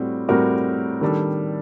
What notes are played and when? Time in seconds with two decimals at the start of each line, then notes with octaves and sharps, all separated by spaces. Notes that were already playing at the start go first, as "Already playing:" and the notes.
Already playing: A2 G3 C4 F#4
0.29 A2 G3 C4 F#4 A#4
1.01 D#3 G3 D4 A4